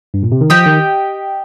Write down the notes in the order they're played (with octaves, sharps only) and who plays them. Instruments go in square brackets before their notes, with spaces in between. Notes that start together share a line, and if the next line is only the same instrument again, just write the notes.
[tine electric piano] G2
A#2
C3
D#3
[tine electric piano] F3 [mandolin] G4 D#5 G5
[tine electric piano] D#3